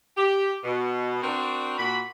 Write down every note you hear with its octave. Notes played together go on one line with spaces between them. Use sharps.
G4
B2
C4 D4 F#4 A#4
A#2 F#4 B5